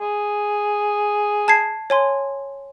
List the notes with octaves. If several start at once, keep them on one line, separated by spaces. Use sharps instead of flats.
G#4
A5 G#6 C7
C#5 G#5 C6